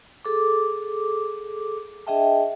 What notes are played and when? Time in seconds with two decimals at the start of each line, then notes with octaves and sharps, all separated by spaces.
0.25 G#4 A4 D6
2.07 D4 G#4 D#5 E5 G5 A5